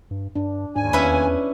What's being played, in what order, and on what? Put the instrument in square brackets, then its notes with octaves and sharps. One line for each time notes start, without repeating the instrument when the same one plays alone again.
[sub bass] G2
[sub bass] G2 [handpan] D4
[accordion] D#2 G#5 [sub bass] G#2 [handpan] D4
[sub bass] E2 [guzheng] C#4 E4 B4